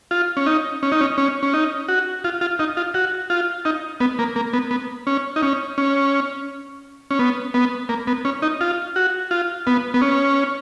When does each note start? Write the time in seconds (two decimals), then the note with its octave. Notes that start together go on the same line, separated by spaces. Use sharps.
0.11 F4
0.37 C#4
0.46 D#4
0.83 C#4
0.92 D#4
1.01 C#4
1.18 C#4
1.43 C#4
1.54 D#4
1.88 F#4
2.24 F4
2.41 F4
2.59 D#4
2.77 F4
2.94 F#4
3.30 F4
3.65 D#4
4.00 B3
4.19 A#3
4.36 A#3
4.53 B3
4.71 B3
5.07 C#4
5.36 D#4
5.43 C#4
5.78 C#4
7.11 C#4
7.19 B3
7.54 B3
7.89 A#3
8.07 B3
8.25 C#4
8.42 D#4
8.61 F4
8.96 F#4
9.31 F4
9.67 B3
9.94 B3
10.01 C#4